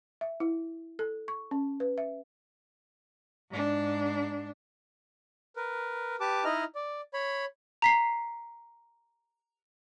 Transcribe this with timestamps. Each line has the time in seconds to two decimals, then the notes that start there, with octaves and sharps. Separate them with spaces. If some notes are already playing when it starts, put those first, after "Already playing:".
0.21 E5
0.40 E4
0.99 A4
1.28 C#6
1.51 C#4
1.80 B4
1.98 E5
3.50 G#2 D4
5.56 A#4 B4
6.20 G4 B4 A5 D6
6.45 D#4 E4 D#5 F6
6.75 D5
7.14 C#5 B5
7.82 A#5 B6 C7